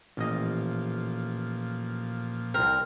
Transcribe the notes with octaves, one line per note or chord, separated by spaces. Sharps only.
A1 A#2 F3 D#5
C2 C4 A#4